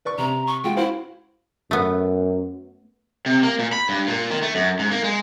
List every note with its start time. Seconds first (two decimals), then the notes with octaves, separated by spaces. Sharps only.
0.05 B4 D5 C#6
0.18 C3 A#5
0.47 C#6
0.64 G#3 F4 F#4 G5
0.76 E4 F#4 C5 F5
1.71 F#2 A3 B3
3.26 C3
3.43 A#3
3.59 A#2
3.73 B5
3.89 G2
4.08 A#2
4.30 D#3
4.43 A3
4.55 F#2
4.79 G#2
4.91 A#3
5.04 G#3